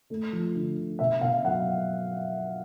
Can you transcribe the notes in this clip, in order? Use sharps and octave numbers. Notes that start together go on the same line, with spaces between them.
A3
F3
D3
D3
B2 E5
B2 F5
F#3 F#5